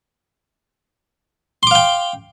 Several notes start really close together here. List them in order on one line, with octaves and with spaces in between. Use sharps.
C6 D6 F5 G5